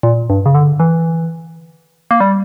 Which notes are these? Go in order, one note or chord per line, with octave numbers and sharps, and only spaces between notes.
A#2
G2
C#3
D3
E3
A#3
G3